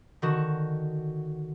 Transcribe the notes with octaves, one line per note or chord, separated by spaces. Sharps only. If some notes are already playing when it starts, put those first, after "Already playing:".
D3 D#3 F#4 E7